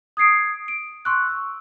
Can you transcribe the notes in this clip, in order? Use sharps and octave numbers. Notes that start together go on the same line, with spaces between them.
D#6 G#6 C7 D7
D7
C6 C#6 E6 F#6
E6